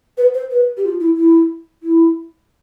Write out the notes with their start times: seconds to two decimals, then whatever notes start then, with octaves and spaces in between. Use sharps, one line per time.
0.18 B4
0.34 C5
0.51 B4
0.77 G4
0.85 F4
1.00 E4
1.17 E4
1.83 E4